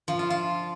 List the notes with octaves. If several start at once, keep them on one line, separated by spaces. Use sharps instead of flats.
F3
F4
F4